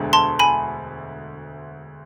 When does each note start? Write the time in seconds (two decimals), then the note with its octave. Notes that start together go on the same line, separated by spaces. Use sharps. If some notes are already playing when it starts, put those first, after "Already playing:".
Already playing: E1 D2 D3 G#3
0.13 A5 C6
0.39 G#5 B5